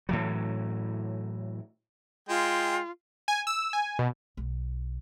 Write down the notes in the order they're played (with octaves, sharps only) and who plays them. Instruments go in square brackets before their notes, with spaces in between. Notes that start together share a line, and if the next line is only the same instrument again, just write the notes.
[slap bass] A2 E3 F#3
[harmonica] G#3 G5 [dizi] F4
[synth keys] G#5
E6
G#5
B2
[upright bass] B1